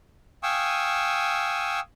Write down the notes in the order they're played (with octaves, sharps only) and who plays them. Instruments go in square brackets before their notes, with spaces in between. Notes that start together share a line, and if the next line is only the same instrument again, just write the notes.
[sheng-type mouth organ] F5 G5 G#5 C#6 D#6 E6